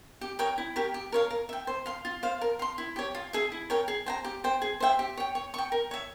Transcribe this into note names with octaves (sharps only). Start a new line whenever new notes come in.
G4
A#4 C#5 G5
E4
G4 A#4 C#5
G4
A#4 C#5 F5
A#4
E5 G5
C5
F5 C6
F4
C5 F5
A#4
F5 C6
E4
G4 C#5
F4
G#4 E5
E4
A#4 C#5 G5
G#4
C5 G5 A#5
G4
C5 G5
G#4
C5 E5 G5
G4
C#5 G5
C#5
G5 C#6
A#4
C#5 E5